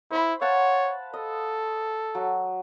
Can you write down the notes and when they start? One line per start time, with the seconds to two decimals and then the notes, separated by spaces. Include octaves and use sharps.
0.11 E4 C5 B5
0.41 C#5 F5 F#5 A5
1.13 A4 D#5
2.15 F#3